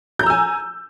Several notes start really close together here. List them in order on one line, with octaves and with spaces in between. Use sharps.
G6 A#5 E6 G#5